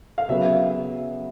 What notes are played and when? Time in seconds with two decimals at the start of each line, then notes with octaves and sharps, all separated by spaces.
0.18 F5
0.29 C#3 F#3 B3 E5